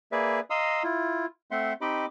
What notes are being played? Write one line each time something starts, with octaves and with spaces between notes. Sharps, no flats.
A#3 G#4 B4 D5 E5
D#5 F5 A#5 C6 D#6 E6
E4 F4
A3 C4 E5 F#5 C6
C4 D#4 G4 D#5 B5 D6